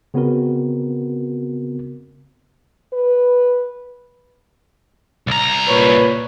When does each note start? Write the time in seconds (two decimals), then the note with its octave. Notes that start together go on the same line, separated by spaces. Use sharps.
0.14 C#3 B3 C4 F#4 A#4
2.94 B4
5.27 C2 A#5
5.68 A#2 B4 C#5